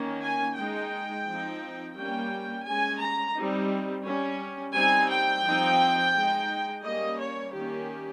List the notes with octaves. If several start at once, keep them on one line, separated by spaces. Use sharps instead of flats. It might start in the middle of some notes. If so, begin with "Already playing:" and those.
Already playing: D#3 A#3 C#4
G#5
G#3 D#4 G5
F3 C4 D#4
G3 A#3 C#4 G5
G#3 C#4 G#5
A#5
G3 C4 D#4
G3 C#4
G3 C4 D#4 G#5
G5
F3 C4 D#4
G#3 D#4
G3 A#3 C#4 D#5
C#5
D#3 A#3 C#4 G4